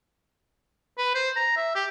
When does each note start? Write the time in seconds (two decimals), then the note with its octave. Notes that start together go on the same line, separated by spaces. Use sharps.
0.98 B4
1.15 C5
1.36 A#5
1.57 E5
1.75 G4